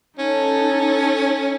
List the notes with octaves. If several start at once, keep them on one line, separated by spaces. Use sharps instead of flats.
C#4 D#4 A4